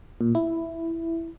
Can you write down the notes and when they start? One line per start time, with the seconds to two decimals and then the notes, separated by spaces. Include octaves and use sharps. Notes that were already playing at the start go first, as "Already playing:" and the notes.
0.21 A#2
0.35 E4